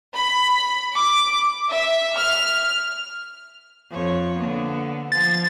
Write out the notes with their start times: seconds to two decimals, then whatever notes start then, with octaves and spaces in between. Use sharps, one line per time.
0.14 B5
0.96 D6
1.69 E5
2.15 F6
3.91 F2 C#5
4.36 D3 A#3 B3
5.12 F3 A6